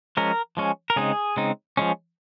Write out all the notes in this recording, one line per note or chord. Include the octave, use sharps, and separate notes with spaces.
F3 G#3 C#4 A#4
F3 G#3 C#4
A#4
C#3 G#3 C4 D#4 G#4
C#3 G#3 C4 D#4
F3 G#3 C#4